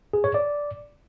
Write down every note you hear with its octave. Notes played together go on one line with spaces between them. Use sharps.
G#4
C#5
D5